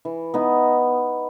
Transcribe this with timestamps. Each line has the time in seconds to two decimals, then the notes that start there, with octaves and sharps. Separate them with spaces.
0.05 E3
0.34 B3 D#4